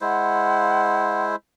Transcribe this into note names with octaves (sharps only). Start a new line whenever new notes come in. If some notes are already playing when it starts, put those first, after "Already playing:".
G#3 E4 C5 F#5